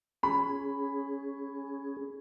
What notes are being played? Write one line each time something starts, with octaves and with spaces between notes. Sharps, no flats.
C#4 G#4 B5